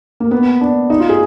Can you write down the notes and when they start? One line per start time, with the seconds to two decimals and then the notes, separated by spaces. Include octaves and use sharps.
0.20 A#3
0.31 B3
0.61 D4
0.90 D#4
1.00 F4
1.09 G#4